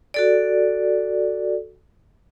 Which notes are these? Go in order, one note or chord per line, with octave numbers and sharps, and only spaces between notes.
F#4 A4 D5